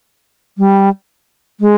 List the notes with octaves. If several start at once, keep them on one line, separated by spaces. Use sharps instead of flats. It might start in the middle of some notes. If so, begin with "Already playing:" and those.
G3
G#3